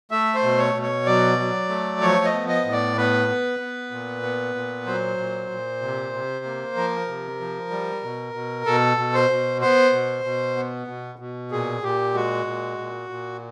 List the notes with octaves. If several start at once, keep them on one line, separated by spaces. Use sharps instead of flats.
A3 E5
C5
B2
C#5
B2
C#5
F#3 D5
F#3
A3
F3 C#5
D#5
B3
D#5
A2
D5
B3 B4
B3
B3
A#2
B3
A#2
F#3 C5
A#2
A#2
C3
C3
A#3
F3 A#4
C3
F3
G3
B2
B2
B2 A4
B2
C5
B2
B3 C5
B2
B2
B3
B2
B2
A#2 G#4
A#2 G4
G#3 F#4
A#2
A#2
A#2